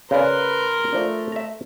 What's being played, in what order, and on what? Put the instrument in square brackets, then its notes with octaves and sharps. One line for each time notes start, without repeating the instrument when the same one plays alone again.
[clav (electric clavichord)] C#3 D5 [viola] A#4 C6 [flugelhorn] B4
[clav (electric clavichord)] F3 D4 [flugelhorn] A3
[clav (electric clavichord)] E5 A#5